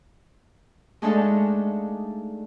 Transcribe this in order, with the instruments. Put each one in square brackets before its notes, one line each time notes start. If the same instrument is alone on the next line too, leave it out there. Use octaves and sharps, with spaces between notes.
[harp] G#3 A3 D4 D#4 A4 F5